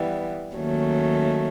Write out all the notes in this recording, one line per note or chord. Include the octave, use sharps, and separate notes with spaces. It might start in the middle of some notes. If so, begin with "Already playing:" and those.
Already playing: E3 G3 B3
D#2 D#3 F#3 A3 C#4